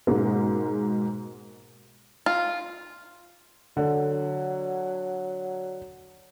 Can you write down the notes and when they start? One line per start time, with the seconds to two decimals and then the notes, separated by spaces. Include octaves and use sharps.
0.07 G#2 B2 G#3 A#3
2.26 F4
3.77 D3 F#3